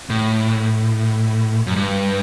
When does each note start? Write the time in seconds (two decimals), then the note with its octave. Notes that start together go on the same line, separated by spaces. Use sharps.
0.10 A2
1.67 F#2
1.76 G2